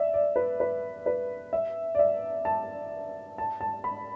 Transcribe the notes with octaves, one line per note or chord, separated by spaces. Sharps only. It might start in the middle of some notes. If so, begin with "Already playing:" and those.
Already playing: D5 E5
D5
B4
B4
B4
E5
D5
E5
A5
A5
A5
B5